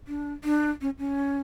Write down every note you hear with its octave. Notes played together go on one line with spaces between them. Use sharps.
D4
D4
C#4
C#4